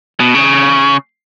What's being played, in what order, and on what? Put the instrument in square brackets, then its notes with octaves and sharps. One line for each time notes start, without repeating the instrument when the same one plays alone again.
[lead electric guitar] B2
C#3